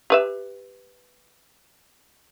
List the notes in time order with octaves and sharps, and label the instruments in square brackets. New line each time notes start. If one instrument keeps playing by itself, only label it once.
[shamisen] G4 B4 E5